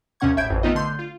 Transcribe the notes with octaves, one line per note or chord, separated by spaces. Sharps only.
D#2 C3 C#4 F#5 C#6 G#6
G#1 A2 E5 G6 G#6 D7
A1 F2
D#3 A3 B3 D#4 F4 D#5
D3 C6 G6
F4